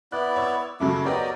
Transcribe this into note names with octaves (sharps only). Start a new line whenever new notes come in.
B3 E4 D5 F#6
C#5 E6
F#2 C#3 F#3 A3 E4 D6
F#3 B3 G4 A#4 D5 D#5